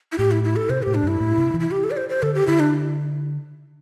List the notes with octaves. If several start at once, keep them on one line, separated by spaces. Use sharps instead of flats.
E4
A2 G4
E4
E4
A4
C3 C5
A2 G4
D4
G2 E4
A2
C3
E3
E4
G4
A4
D5
C5
C5
D3 A4
G4
D3 E4
D4